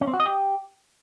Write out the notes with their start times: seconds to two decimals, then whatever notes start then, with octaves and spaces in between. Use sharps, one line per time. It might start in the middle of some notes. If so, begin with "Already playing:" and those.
0.01 C#4
0.07 C4
0.14 F#4
0.20 D#5
0.26 G4